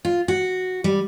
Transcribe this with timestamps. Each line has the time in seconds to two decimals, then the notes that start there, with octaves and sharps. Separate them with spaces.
0.05 F4
0.28 F#4
0.84 G3